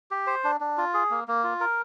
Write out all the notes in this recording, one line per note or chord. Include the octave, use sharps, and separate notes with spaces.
G4
C5
D4
D4
F4
G#4
A#3
A#3
F4
A#4